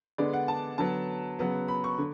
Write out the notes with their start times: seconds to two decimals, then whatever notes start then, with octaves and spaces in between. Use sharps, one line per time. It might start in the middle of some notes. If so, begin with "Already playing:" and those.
0.18 D3 G#3 B3 D5
0.33 F#5
0.48 A5
0.78 D3 F#3 B3 A5
1.39 C#3 F#3 B3
1.68 B5
1.84 C#6
1.98 D3